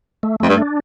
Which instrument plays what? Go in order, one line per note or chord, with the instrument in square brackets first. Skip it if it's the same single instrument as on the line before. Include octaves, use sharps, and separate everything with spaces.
[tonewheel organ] A3
[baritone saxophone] F2 [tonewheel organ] A3
[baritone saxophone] G2
[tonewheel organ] D4